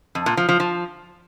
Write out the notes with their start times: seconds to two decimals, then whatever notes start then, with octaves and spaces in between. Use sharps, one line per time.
0.15 F2
0.26 A#2
0.37 F3
0.49 F3
0.60 F3